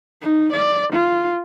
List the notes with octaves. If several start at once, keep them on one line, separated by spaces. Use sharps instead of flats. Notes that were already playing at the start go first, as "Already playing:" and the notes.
D#4
D5
F4